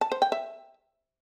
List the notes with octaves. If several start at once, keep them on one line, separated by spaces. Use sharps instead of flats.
A5
C5
G5
E5